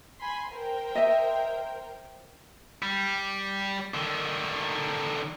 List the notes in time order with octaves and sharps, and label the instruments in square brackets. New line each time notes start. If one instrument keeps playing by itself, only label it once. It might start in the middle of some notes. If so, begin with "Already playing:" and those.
[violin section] G#5 B5 C6
A#4 C5 G5
[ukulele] D#5 E5
[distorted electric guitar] G3
D3 D#3